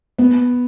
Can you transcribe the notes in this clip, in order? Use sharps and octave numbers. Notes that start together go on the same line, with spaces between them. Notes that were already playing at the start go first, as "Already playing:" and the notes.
B3